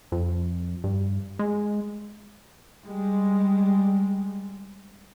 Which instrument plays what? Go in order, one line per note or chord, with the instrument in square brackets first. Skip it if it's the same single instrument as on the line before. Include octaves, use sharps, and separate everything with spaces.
[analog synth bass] F2
G2
G#3
[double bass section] G3 G#3